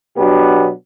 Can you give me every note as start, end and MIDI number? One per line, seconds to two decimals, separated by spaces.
0.17 0.70 47
0.17 0.70 54
0.17 0.70 59
0.17 0.70 62
0.17 0.70 67